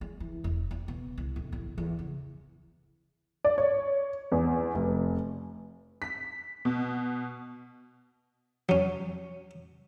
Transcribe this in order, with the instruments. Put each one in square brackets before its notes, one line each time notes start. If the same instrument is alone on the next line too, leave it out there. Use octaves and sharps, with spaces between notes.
[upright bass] G#3
E3
E1
D#2
B2
C2
D1
A1
E2
C#3
[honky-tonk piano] D5
C#5
E2
F1
B6
B2
[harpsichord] F#3 C#4